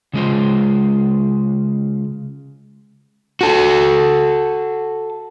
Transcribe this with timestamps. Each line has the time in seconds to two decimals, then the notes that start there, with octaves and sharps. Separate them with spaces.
0.13 C#3 G#3 F4 C5
3.41 F#4 A4